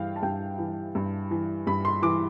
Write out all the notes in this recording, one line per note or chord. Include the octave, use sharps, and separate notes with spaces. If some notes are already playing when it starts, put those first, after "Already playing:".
Already playing: G2 E3 F5 G5
A5
G2 G5
E3
G2
E3
G2 B5
C6
E3 D6